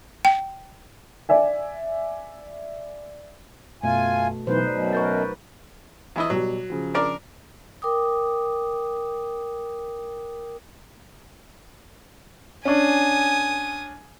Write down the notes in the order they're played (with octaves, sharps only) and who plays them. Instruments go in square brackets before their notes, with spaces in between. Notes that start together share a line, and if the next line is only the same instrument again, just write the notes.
[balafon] G5
[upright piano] D5 E5 G#5
[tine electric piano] F#2 E5 [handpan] B2 A3 [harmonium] F4 G#5
[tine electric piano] B2 F#3 B3 [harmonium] E3 [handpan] D#4 B4 C5
[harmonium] F#2 B2 [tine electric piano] D5
[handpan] F#3 A#4 B4 [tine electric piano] C#6 G6 A6
[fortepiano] E2 E4 D#5
[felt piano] B2 G3 [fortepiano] F#3
[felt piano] C#3 F3
[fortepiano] D4 A#4 D5
[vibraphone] A#4 G5 D6 D#6
[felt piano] C#4 D4 [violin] G#5 D#6